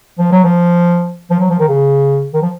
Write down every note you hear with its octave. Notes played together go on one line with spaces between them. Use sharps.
F3
F#3
F3
F3
F#3
F3
D#3
C#3
D#3
F3